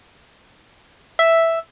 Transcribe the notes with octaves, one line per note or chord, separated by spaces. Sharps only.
E5